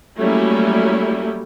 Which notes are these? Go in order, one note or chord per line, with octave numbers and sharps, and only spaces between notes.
F#3 G3 A3 A#3 C#4 E4